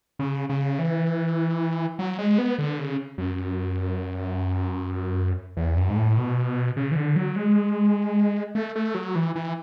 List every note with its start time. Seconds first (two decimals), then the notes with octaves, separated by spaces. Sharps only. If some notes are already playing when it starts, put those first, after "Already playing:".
0.19 C#3
0.49 C#3
0.79 E3
1.99 F#3
2.18 G#3
2.38 B3
2.58 D3
2.79 C#3
3.18 F#2
5.57 E2
5.77 F#2
5.89 G#2
5.96 A2
6.17 B2
6.77 C#3
6.91 E3
6.96 D3
7.16 F#3
7.36 G#3
8.55 A3
8.75 A3
8.95 F#3
9.15 E3
9.35 E3